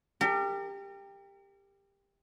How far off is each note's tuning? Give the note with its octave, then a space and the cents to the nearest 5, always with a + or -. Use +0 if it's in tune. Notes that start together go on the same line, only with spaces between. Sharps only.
G4 +20 A#4 -35